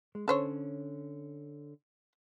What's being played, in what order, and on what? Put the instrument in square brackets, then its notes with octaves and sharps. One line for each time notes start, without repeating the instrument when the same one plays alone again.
[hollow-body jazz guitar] G#3
[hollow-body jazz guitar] D3 C#4 [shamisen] A4 C5 C#5